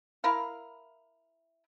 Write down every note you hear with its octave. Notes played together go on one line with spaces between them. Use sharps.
E4 A#4 F5